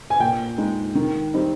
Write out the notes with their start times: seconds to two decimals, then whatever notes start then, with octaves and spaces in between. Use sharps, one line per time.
0.10 G#5
0.20 A#2 G5
0.58 G#3 D#4
0.95 D#3
1.34 G3 C4 D#4